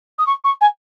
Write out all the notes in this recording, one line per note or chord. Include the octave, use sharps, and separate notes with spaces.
D#6
C#6
C#6
G#5